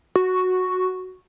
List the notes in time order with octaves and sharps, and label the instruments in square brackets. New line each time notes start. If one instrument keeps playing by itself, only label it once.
[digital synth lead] F#4